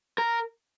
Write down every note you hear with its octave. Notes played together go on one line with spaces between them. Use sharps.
A#4